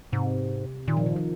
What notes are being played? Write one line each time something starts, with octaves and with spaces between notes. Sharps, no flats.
G#2 C3
A#2 D#3
F3
D#3
F3